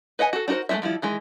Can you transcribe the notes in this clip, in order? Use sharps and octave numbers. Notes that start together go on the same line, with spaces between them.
B4 D#5 F#5 G#5
F#4 A4
D4 D#4 F#4 A#4 C5
G#3 A3 C4 F#4 E5
D#3 F3 G3 E4
D#3 E3 G#3